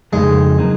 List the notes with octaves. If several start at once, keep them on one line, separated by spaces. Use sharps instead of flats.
F2 C#3 G#3 D#4
F#3 A#3 D#4